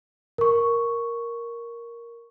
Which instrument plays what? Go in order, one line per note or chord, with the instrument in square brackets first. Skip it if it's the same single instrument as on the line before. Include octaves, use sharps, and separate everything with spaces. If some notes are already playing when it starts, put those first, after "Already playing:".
[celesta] A#4 C#6